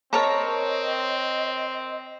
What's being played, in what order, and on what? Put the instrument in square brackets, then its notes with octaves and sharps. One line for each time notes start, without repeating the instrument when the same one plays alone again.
[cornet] C4 [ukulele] A#4 A5 [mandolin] C#5 A#5 [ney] D#5